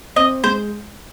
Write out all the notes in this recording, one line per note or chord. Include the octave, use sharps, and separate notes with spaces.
C4 D#5
G#3 C5